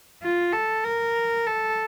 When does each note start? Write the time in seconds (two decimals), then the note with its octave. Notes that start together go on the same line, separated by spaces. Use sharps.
0.22 F4
0.53 A4
0.85 A#4
1.47 A4